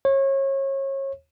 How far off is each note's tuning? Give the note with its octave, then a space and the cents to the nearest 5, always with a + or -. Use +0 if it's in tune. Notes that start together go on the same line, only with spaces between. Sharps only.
C#5 -30